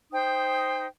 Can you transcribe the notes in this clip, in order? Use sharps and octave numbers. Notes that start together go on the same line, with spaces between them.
D#4 C5 G5 D#6